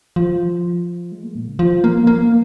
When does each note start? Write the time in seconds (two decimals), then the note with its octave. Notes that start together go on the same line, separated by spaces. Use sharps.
0.16 F3
1.12 G#3
1.24 A#3
1.35 A#2
1.48 C#3
1.59 F3
1.84 A#3
2.07 A#3